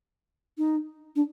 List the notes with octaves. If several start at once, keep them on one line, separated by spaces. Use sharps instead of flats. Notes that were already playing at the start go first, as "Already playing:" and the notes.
D#4
D4